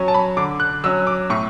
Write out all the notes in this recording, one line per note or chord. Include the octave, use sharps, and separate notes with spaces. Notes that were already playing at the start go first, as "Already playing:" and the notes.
Already playing: F#3 C#4
A5
B5
D3 D6
F#6
F#3 C#4 E6
D6
A2 C#6